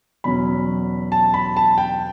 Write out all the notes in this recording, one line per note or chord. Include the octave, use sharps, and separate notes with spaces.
E2 B2 F#3 C#4 B5
A5
B5
A5
G5